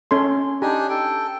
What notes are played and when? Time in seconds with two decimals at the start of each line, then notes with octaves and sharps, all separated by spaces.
0.11 C#4 A4 C6
0.62 D4 D#4 G4 G#5
0.90 A4 G5